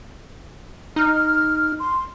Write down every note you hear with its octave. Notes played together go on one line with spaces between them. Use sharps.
D#4 F6
C6